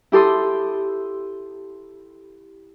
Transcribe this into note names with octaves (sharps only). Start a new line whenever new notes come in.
E4 G4 A4 C6 D#6